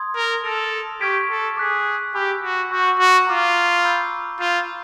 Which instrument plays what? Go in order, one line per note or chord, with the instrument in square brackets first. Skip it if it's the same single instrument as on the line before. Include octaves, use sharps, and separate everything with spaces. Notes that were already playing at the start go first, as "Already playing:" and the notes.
Already playing: [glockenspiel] C6 D#6 G#6
[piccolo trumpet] A#4
[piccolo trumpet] A4 [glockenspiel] F6 A#6 D7 F7
[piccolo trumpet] G4 [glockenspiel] C#6 F6 G#6 B6 D7
[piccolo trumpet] A4
[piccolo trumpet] G#4 [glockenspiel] D6 F#6 B6
[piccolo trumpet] G4 [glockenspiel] G#5 B5 E6 G6
[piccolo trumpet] F#4
[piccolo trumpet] F#4 [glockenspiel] C#6 E6 G6
[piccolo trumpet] F#4
[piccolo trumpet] F4 [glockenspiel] A#5 D6 F6
[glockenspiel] B5 E6 G6
[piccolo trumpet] F4 [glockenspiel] G6 C7 E7